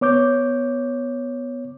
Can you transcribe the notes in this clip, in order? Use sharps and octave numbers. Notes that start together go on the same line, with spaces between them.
B3 C#5 D6 G6